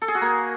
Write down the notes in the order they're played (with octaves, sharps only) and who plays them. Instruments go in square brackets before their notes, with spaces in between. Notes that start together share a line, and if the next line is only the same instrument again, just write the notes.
[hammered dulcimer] A4
G#4
F#4
A#3